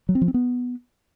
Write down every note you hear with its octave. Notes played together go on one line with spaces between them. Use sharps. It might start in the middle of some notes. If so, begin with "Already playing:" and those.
F#3
C4
F3
C4
B3